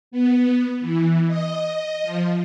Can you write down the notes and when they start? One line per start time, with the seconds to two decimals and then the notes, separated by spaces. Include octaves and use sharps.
0.11 B3
0.81 E3
1.27 D#5
2.03 F3